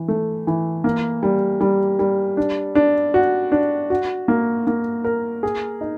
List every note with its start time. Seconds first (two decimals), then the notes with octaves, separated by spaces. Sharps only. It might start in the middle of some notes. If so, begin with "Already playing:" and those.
Already playing: E3
0.08 A3
0.47 E3
0.84 A#3
1.23 G3
1.61 G3
1.99 G3
2.37 D4
2.75 D4
3.14 F#4
3.52 D4
3.90 F#4
4.28 A#3
4.67 A#3
5.04 A#4
5.43 G#4
5.81 D#4